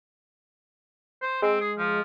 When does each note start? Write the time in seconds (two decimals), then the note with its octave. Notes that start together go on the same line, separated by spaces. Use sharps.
1.22 C5
1.42 G#3 C4
1.61 G#4
1.78 F3